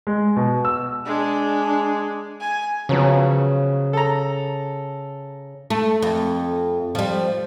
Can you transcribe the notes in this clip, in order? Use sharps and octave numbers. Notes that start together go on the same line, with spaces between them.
G#3
B2
E6
G#3 D4
G#5
C#3 F3 F#3 B3
A4 A#5
A3
F2
F3 G3